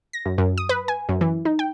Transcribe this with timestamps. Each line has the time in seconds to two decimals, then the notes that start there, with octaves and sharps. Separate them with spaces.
0.13 A#6
0.26 F#2
0.38 F#2
0.58 D#6
0.69 B4
0.88 G#5
1.09 F#2
1.21 E3
1.45 D#4
1.59 G5